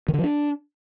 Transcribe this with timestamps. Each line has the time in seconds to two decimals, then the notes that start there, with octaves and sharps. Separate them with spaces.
0.08 D#3
0.14 D3
0.19 F3
0.24 D4